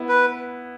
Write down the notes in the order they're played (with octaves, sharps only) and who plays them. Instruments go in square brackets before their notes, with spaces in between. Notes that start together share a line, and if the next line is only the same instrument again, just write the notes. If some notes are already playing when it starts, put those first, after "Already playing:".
Already playing: [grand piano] B3 E4
[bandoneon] B4